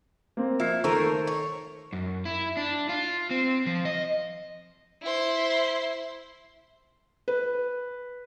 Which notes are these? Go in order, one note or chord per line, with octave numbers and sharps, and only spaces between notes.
A#3 C4
F3 E4 F6 C7
D#3 A3 A#4 C5 C#6 E6
C#5
F#2
E4
D4
F4
C4
F3
D#5
E4 C5
B4